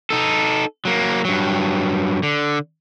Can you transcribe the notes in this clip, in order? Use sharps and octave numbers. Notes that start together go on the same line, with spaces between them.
D#4 A4
F#3 A#3
G2 F#3
D3